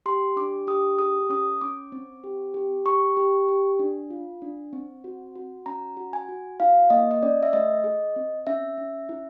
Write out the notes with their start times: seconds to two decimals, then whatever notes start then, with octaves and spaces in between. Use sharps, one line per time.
0.06 G4 C6
0.36 D4 D6
0.67 G4 D#6
0.99 G#4 D#6
1.30 C#4 D#6
1.61 C#4 D6
1.92 C4
2.24 G4
2.54 G4
2.86 G4 C#6
3.17 G4
3.48 G4
3.79 D4
4.10 F4
4.42 D4
4.73 C4
5.04 F#4
5.35 F#4
5.66 C#4 A#5
5.97 F#4
6.13 G#5
6.29 F#4
6.60 E4 F5
6.90 A#3 D#5
7.11 D#5
7.23 C#4 D5
7.43 E5
7.53 A3 D#5
7.84 G#4
8.16 C4
8.47 C#4 E5
8.78 C#4
9.09 E4